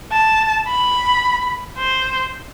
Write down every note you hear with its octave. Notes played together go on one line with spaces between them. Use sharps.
A5
B5
C5